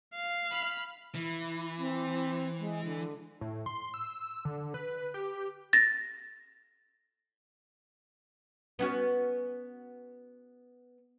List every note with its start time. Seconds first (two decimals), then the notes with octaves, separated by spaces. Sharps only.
0.15 F5
0.50 B5 F6
1.15 E3 E4
1.79 C4
2.59 G#3
2.85 D3
3.41 A2
3.66 C6
3.94 E6
4.45 D3
4.74 B4
5.14 G4
5.73 A6 A#6
8.79 B3 C#4 F#4